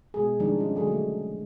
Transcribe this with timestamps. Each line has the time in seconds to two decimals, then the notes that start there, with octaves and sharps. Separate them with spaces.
0.14 B2 G#3 G#4
0.40 D#3 F3 G3 G#3 D4 D#4
0.58 C#4 F4
0.75 D3 F#3 G#3 G#4 A4
0.87 D3 A3